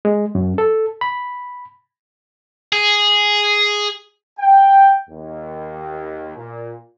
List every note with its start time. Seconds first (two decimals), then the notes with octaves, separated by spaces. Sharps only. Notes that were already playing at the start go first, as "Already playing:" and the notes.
0.05 G#3
0.35 F#2
0.58 A4
1.01 B5
2.72 G#4
4.39 G5
5.09 D#2
6.37 A#2